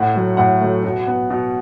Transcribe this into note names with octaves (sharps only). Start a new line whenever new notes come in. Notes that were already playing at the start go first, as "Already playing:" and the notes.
Already playing: A2 F#5
F#3 A3
A2 F#5
F#3 A3
B2
B3
B2